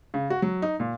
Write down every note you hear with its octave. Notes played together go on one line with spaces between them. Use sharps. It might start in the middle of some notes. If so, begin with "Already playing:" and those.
C#3
F#4
F#3
D#4
A#2